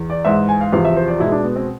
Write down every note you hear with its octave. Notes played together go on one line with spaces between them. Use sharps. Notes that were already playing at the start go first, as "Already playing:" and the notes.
Already playing: E2
D5
G#2 E3 G#3 E5
G#5
F5
E2 C3 F3 F5
E5
C5
D5
B2 G#3 E4
D4
B3
C4